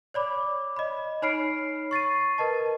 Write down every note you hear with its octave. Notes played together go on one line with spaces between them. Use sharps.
C#5 D5 B5 D6
D#5 B5
D#4 C#5 B5 F6 C7 D7
C#6 A6 C7 D#7
A#4 B4 D#5 A5